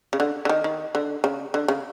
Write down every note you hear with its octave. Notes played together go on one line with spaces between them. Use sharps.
C#3
D3
D3
D#3
D#3
D3
C#3
D3
C#3